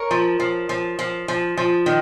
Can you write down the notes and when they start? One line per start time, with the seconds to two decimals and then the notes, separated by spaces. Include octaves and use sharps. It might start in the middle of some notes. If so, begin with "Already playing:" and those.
Already playing: A#4 C#5
0.11 F3
0.40 F3
0.69 F3
0.99 F3
1.28 F3
1.57 F3
1.86 D#3